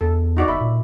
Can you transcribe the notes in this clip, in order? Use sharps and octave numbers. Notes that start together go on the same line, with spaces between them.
E2 A4
D#4 F#4 D5
G1 E5 B5
A#2